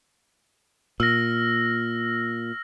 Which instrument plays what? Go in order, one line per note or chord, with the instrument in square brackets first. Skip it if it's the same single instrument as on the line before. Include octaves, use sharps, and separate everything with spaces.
[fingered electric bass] A#2 [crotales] E6 F6 A#6